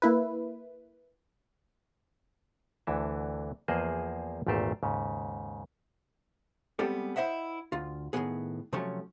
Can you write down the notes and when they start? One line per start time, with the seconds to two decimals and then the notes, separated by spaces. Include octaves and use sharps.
0.02 A#3 E4 B4
2.87 D2 D3 E3 E5
3.68 E2 F3 A#3 G#4 C5 D#5
4.47 G#1 E2 A#2 A3 G4 C5
4.83 D#2 G#2 C#3
6.79 G3 G#3 B3 C4 G4 A4
7.16 E4 C5 D#5 E5 F#5
7.72 D2 F4
8.13 A2 D#3 E3 F#3 B3 G#4
8.73 C3 F3 F#3 A3 C#4